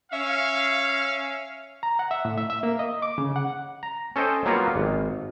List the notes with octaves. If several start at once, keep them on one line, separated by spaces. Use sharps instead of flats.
C#4 E5 F5
A#5
F#5
E5
A2
E5
E5
A#3
D#5
D6
C#3
F#5
A#5
C#4 A4 C5 D#5 G5
F#3 G3 A#3 B3 F4 F#4
G#1